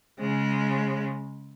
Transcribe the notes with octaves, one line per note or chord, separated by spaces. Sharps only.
C#3 G#3